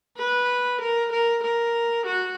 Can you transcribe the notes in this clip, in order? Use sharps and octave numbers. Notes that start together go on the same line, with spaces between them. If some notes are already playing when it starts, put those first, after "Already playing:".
B4
A#4
A#4
A#4
F#4